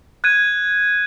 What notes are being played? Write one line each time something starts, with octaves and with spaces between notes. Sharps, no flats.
F#6 G#6 D#7